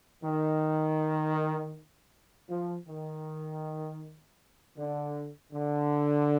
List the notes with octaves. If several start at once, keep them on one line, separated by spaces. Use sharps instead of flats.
D#3
F3
D#3
D3
D3